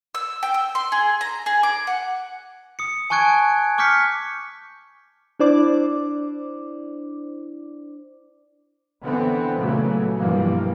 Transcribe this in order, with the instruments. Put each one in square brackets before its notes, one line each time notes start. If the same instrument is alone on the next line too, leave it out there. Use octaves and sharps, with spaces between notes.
[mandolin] E6
G5
E6
C6
G#4
A#5
G#4
D6
F#5
[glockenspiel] D#6 C#7
G#5 A5 C#6 F#6 G#6 D7
C#6 D6 F6 G6 B6 C#7
[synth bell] D4 E4 C5 D5 D6
[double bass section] D3 E3 B3 C4
A#2 C#3 E3 F#3 A3
G2 B2 E3 F3 G3 A#3